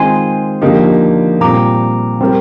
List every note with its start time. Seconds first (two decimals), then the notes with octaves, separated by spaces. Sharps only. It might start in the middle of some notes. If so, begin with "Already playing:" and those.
Already playing: D#3 G#3 C4 F4 C5 G#5 C6
0.61 D3 F3 A#3 D#4 G4
1.40 A#2 G3 C4 A#5 D6
2.21 G3 C4 G4 A#4